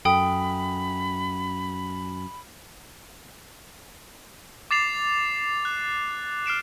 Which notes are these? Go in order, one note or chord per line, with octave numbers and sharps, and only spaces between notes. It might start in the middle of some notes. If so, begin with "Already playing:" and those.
F#2 A4 G5 B5 D#6
D6 A6 C7 F7
F#6
F6 C7 D7 E7